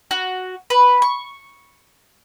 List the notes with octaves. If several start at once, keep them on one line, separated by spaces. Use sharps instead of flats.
F#4
B4
C#6